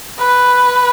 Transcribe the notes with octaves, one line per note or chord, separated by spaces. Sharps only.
B4